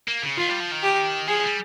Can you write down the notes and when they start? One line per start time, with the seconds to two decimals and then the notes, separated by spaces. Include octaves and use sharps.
0.08 A#3
0.23 C#3
0.38 D#3 F4
0.49 G3
0.60 F3
0.72 D#3
0.83 G4
1.28 F3 G#4
1.43 G3